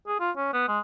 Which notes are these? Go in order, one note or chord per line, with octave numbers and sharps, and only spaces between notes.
G#4
F4
C#4
B3
G#3